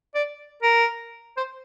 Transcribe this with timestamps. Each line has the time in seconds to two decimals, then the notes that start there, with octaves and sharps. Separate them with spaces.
0.15 D5
0.63 A#4
1.37 C5